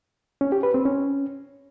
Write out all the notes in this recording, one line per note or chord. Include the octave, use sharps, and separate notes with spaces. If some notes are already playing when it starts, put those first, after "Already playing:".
C#4
G4
B4
C4
C#4